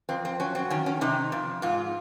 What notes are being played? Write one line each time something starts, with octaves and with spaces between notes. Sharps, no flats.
F2 C4
C4
F#3 C#4
C4
D#3 C#4
C#4
C3 D#4
F2
G#2 F4